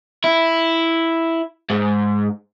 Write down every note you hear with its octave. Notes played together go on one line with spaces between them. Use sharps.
E4
G#2